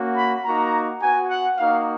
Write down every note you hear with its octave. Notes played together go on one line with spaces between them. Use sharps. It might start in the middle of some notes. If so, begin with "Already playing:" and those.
Already playing: A#3 C#4 F#4
B5
A#3 D#4 F#4 A#5
B3 F#4 G#5
F#5
A#3 D#4 F#4 F5